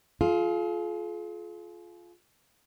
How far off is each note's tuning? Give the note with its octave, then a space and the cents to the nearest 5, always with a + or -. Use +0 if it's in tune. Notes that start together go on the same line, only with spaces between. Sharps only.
F4 +0 G#4 +45